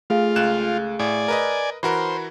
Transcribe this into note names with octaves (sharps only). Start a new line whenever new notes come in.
A3 F4 G#4 F5
C#2 F#6 E7
A2 D5 G#5
A#4 B4 D#5
E3 F#4 A#4 C5 B5